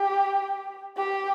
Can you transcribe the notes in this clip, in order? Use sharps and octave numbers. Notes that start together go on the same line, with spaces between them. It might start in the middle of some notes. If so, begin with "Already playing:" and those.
Already playing: G4
G4